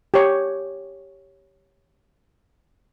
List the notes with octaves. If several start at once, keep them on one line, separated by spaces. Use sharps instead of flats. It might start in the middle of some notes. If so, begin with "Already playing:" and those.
G4 C#5